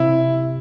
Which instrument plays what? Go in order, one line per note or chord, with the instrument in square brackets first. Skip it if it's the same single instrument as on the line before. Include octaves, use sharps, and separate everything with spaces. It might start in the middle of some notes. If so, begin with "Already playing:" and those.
Already playing: [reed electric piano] C3 [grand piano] E4